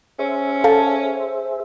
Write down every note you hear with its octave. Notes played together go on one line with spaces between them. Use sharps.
C#4 G#4 C5 E5
A4 F5 A5